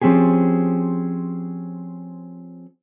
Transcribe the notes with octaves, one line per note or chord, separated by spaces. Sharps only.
F3 C4 C#4 G4 G#4